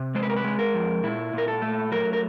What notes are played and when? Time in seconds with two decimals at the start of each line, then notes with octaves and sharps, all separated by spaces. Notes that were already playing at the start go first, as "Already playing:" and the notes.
Already playing: C3
0.15 G#3 C5
0.23 B4
0.30 A#4
0.37 B4
0.44 G#3
0.59 A#4
0.74 F2
1.03 A#2 E4
1.33 A#2 A#4
1.48 A4
1.62 A3
1.92 F#3 A#4
2.13 A#4